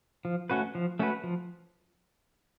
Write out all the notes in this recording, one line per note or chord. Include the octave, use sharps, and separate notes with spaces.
F3
A3 C#4 F#4 B4
F3
A3 C#4 F#4 B4
F3